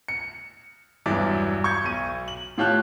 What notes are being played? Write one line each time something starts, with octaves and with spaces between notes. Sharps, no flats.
C#7
E1 E2 G2 F#3 D5 E5
C#6 G6 G#6 C#7
B1 D#7
F#7
A2 F4 G4 C#5 A5 F#6